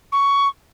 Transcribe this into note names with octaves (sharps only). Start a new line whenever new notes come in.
C#6